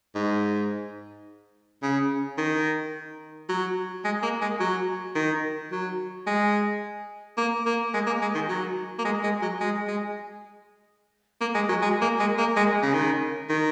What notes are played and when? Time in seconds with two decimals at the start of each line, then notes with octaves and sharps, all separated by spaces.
0.15 G#2
1.82 C#3
2.38 D#3
3.49 F#3
4.05 G#3
4.23 A#3
4.41 G#3
4.60 F#3
5.15 D#3
5.72 F#3
6.27 G#3
7.37 A#3
7.66 A#3
7.94 G#3
8.07 A#3
8.22 G#3
8.35 D#3
8.49 F#3
8.99 A#3
9.05 G#3
9.24 G#3
9.42 F#3
9.61 G#3
9.88 G#3
11.41 A#3
11.55 G#3
11.69 F#3
11.82 G#3
12.01 A#3
12.20 G#3
12.38 A#3
12.57 G#3
12.83 C#3
12.94 D#3
13.50 D#3